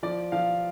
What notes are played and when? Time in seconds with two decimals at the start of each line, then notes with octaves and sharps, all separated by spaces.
0.03 F3 D5
0.32 F3 F5